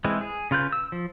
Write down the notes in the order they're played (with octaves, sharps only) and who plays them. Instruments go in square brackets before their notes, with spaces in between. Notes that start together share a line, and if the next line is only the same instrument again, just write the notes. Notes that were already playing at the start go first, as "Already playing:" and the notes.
[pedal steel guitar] E3 G#3 C4 E4
G#4
C#3 F4 B4 G6
E6
F3